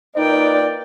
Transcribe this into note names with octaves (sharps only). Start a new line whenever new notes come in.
A#2 D#4 A#4 B4 D5 G5